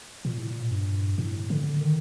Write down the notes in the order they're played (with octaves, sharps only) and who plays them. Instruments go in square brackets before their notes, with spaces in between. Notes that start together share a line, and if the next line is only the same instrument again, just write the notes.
[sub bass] A#2
A2
A#2
G2
A2
D3
D#3